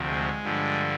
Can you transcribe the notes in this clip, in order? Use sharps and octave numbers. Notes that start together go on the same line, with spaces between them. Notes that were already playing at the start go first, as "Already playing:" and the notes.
Already playing: D2 C3 F3
G#3
G2 D3 F3